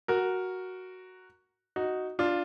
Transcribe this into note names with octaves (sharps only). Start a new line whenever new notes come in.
F#4 A#4
D#4 F#4
D4 F4